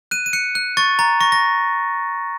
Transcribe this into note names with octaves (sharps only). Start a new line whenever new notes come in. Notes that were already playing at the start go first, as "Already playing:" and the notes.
F#6 D#7
D#7
F#6 C#7
F#6
C#6 A6
A#5 A6
C#6 A#6
A#6